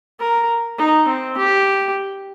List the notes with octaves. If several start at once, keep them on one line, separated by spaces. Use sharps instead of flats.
A#4
D#4
C4
G4